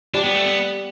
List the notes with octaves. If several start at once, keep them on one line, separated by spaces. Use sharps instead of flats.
G3 D4
B3
A3
B3